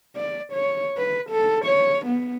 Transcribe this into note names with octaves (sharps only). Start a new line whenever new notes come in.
D5
C#5
B4
A4
C#5
B3